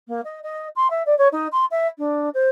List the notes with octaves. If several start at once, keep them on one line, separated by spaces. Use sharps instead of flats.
A#3
D#5
D#5
C6
E5
D5
C#5
D#4
C6
E5
D4
C5